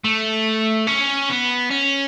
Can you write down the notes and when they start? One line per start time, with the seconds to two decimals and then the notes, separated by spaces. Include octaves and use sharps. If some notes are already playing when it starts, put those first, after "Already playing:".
0.04 A3
0.87 C#4
1.30 B3
1.70 C#4